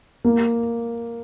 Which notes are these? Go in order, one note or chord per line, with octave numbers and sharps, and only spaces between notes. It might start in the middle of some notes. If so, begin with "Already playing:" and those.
A#3